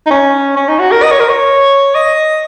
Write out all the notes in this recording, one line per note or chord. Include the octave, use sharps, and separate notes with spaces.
D#4
C#4
C#4
D#4
F#4
A#4
D#5
C#5
A#4
C#5
D#5